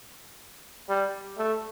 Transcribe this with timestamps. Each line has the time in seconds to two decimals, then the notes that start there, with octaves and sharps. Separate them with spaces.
0.89 G3
1.38 A3